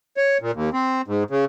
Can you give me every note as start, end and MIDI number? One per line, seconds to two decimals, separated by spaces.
0.17 0.38 73
0.41 0.51 46
0.54 0.70 39
0.73 1.02 60
1.08 1.23 44
1.30 1.45 49